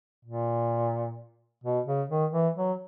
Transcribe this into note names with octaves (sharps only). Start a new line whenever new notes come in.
A#2
B2
C#3
D#3
E3
F#3